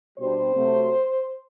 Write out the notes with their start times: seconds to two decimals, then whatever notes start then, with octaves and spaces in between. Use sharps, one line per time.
0.17 B2 G3 D4 C5
0.54 C3 F#3 A3